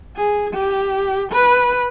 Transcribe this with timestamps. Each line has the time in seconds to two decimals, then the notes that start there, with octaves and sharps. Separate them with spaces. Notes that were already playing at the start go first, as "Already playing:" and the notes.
0.16 G#4
0.53 G4
1.32 B4